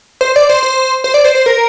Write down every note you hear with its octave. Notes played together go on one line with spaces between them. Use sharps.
C5
D5
C5
C5
C5
D5
C5
C5
A#4